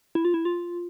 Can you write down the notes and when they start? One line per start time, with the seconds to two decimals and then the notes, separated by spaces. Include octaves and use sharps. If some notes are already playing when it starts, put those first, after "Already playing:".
0.15 E4
0.25 F4
0.34 E4
0.45 F4